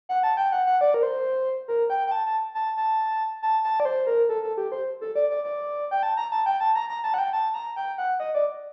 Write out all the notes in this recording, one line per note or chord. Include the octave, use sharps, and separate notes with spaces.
F#5
A5
G5
F#5
F#5
D5
A#4
C5
A#4
G5
G5
A5
A5
A5
A5
A5
A5
D5
C5
A#4
A4
A4
G4
C5
A4
D5
D5
D5
G5
A5
A#5
A5
G5
A5
A#5
A#5
A5
F#5
G5
A5
A#5
G5
F#5
D#5
D5